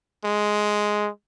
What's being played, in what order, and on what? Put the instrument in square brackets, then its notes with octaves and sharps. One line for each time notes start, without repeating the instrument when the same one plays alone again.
[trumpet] G#3